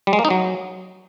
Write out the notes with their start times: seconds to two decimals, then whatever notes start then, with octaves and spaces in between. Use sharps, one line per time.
0.07 G3
0.13 G#3
0.19 A#3
0.25 D#4
0.30 F#3